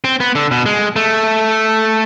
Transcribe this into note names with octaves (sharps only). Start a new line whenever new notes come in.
C4
B3
D3
B2
G#3
A3